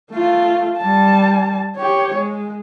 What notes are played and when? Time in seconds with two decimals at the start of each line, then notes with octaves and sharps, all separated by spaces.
0.11 A3 F4
0.78 G3 A5
1.77 G4 C#5
2.14 G#3